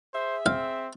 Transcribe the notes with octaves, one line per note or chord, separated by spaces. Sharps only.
G#4 C5 E5
C4 F5